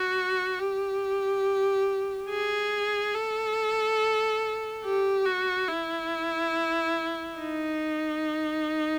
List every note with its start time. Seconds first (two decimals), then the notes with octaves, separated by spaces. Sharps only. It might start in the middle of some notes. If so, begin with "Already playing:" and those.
Already playing: F#4
0.59 G4
2.29 G#4
3.14 A4
4.84 G4
5.26 F#4
5.68 E4
7.39 D#4